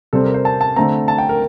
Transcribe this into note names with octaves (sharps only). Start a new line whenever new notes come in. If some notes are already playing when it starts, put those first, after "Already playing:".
C3 G3 C4 A4
A#4
C5
A5
A5
D3 A3 C4 A#5
A5
G5
A#4